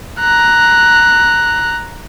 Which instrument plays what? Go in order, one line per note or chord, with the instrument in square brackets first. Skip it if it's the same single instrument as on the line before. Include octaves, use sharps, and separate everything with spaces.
[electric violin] A#5 F#6